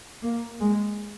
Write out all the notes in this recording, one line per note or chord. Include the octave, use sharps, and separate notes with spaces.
A#3
G#3